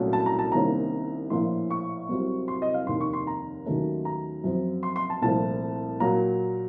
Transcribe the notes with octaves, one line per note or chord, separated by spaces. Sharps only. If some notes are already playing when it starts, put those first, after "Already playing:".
Already playing: C2 A#2 F#3 A3 C#4
A5
A#5
A5
C2 C3 D#3 A#3 C#4 A#5
A#1 A2 F3 A#3 F4 C6
C#6
C2 C3 F#3 C4 F4
C6
D#5
F5
F1 D#2 D#3 C6
C#6
C6
A#5
D#2 D#3 F#3 A3 C#4
A#5
F#2 F3 C4
C6
C6
A5
C2 A#2 F3 A3 A5
A#2 F#3 A#3 A#5